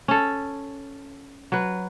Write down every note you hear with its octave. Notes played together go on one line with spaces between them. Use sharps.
C#4 A4
F#3 B4